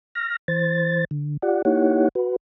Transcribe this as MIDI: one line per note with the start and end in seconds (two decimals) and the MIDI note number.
0.15 0.37 89
0.15 0.37 94
0.48 1.05 52
0.48 1.05 72
0.48 1.05 93
1.11 1.37 50
1.42 1.62 65
1.42 1.62 67
1.42 1.62 74
1.42 1.62 78
1.65 2.09 58
1.65 2.09 63
1.65 2.09 64
1.65 2.09 67
1.65 2.09 73
1.65 2.09 78
2.15 2.36 66
2.15 2.36 71